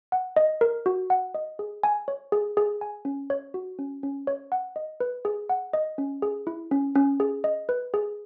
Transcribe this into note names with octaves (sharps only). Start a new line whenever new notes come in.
F#5
D#5
A#4
F#4
F#5
D#5
G#4
G#5
C#5
G#4
G#4
G#5
C#4
C#5
F#4
C#4
C#4
C#5
F#5
D#5
B4
G#4
F#5
D#5
C#4
G#4
E4
C#4
C#4
G#4
D#5
B4
G#4